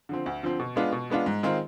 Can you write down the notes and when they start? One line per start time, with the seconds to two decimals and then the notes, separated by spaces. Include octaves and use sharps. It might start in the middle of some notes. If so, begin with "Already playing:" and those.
0.09 D3 F3 C4
0.26 D2
0.43 D3 F3 C4
0.60 B2
0.76 G#3 B3 D4 F4
0.92 B2
1.10 G#3 B3 D4 F4
1.26 G#2
1.43 D#3 G#3 C4 F4